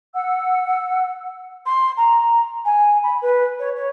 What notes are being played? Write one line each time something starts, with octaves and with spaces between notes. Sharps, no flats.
F#5 E6
C6
A#5
G#5
B5
B4
C#5
C#5